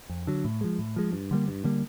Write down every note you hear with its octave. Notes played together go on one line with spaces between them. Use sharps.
F2
D3 F#3
A2
F3 G#3
A2
F3 G#3
G2
D3 G3 A#3
G2
D3 G3 A#3